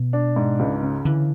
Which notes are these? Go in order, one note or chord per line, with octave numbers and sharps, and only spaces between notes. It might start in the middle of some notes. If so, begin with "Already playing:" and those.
Already playing: B2
D4
G#2
C#2
C#3
D3 E3